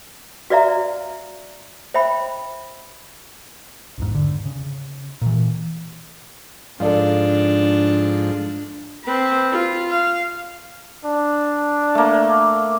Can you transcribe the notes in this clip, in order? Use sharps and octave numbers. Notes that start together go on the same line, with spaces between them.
F#4 B4 D5 E5 F5 A#5
C5 E5 G5 B5
A1 E2 G#2
D3
C#3
A#2 E3
G#2 F3 D4 A4 D5 F5
C4 B4
F4
F5
D4
A3 A#3